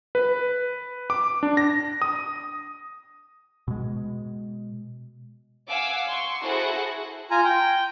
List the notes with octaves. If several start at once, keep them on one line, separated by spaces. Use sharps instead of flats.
B4
D6
D4
A#6
D#6
B2 G#3
F5 F#5 G#5 D6 E6
C6 C#6
E4 F#4 G#4 A4 C5 F#5
F4 G#5 A#5
G5